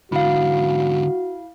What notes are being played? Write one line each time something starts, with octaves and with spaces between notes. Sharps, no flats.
G#2 D3 E4 F#4 F5